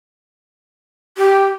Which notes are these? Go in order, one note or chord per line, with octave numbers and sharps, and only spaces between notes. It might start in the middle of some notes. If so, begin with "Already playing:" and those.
G4